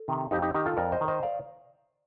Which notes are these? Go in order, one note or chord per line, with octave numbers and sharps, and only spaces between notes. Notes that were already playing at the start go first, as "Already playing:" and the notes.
Already playing: A4
C3 D#3
F2 D#4 G4
D#4 G4
D#3 D#4 G4
F4 A4
F2 A#4 D5
C5 D#5
D#3
C5 D#5
D5 F5